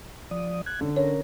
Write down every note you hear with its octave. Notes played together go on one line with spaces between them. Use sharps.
F3 D5 D#6
F#6 G#6
D3 C#4
C#4 A#4 C#5